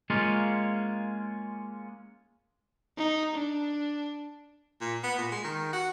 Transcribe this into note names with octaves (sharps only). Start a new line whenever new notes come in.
G#3 A#3 C#4 F4
D#4
D4
A#2
B3
A#2
G#3
D#3
F#4